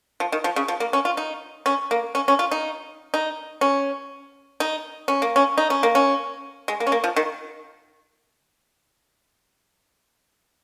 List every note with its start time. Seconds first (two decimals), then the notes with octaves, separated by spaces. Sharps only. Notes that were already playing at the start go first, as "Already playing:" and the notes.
0.20 F3
0.32 D#3
0.44 F3
0.56 C#3
0.68 F3
0.80 A#3
0.93 C#4
1.05 F4
1.17 D#4
1.66 C#4
1.91 A#3
2.15 C#4
2.28 C#4
2.39 F4
2.51 D#4
3.14 D#4
3.61 C#4
4.60 D#4
5.08 C#4
5.22 A#3
5.36 C#4
5.58 D#4
5.70 C#4
5.83 A#3
5.95 C#4
6.68 G#3
6.80 A#3
6.87 C#4
6.92 A#3
7.04 F3
7.16 D#3